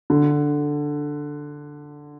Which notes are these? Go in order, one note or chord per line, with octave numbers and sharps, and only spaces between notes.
D3